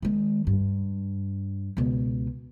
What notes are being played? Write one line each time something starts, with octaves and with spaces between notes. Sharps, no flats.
D#3 G#3
G2
C#2 B2